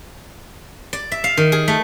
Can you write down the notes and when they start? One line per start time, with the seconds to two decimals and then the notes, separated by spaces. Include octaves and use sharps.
0.93 D5
1.12 E5
1.24 F5
1.37 D#3
1.52 G#4
1.68 A3